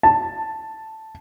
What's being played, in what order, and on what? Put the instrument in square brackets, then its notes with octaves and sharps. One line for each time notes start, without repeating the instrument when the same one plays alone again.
[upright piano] A5